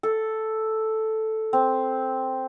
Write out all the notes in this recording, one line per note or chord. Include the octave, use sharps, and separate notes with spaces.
A4
C4